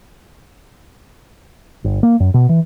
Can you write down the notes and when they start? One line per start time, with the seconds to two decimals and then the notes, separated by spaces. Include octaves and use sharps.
1.84 G1
2.03 A#3
2.20 F#2
2.34 B2
2.49 E3